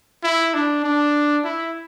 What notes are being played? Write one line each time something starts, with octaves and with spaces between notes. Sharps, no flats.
E4
D4
D4
E4